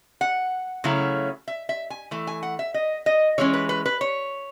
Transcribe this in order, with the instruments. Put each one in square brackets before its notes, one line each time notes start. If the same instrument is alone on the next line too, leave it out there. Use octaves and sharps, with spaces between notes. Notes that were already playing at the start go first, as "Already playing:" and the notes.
[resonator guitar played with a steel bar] F#5
C#3 F#3 A3 C#4 E4
E5
E5
G#5
E3 A3
G#5
F#5
E5
D#5
D#5
E3 G#3 C#4 C#5
B4
B4
B4
C#5